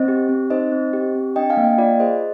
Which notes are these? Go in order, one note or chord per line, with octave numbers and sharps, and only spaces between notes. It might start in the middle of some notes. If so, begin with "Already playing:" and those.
Already playing: C4 C5 D#5
G4
C4
D#4 C5 D#5
C4
G4
C4
D4 D#5 G5
F5 G#5
A#3
D#5 G5
F4 D5 F5
G#4 C5 D#5